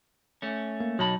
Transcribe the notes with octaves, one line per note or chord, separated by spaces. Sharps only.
A3 C#4
A#3
B2 F#3 D#4 A5 B5